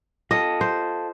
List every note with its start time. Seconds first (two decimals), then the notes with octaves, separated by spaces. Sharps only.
0.31 F4 A4 D#5
0.61 C5